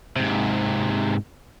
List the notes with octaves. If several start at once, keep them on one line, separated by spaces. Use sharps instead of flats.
G#2 C3